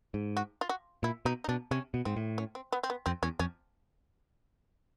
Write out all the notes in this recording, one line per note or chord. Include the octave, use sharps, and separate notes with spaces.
G#2
F#4
F4
F#4
A#2 E4
B2 D#4
D#4
B2 D4
C3 C#4
B2
G#2 C4
A2
C#4
C4
B3
C4
B3
F2 C4
E2 C#4
F2 C#4